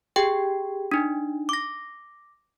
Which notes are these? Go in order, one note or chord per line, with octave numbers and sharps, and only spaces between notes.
G4 G#4 G5 G#6
D4 D#4
D6 A#6